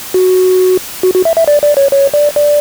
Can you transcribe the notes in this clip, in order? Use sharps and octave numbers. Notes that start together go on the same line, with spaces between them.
F#4
F#4
F#4
E5
E5
D5
D5
C#5
C#5
D5
D5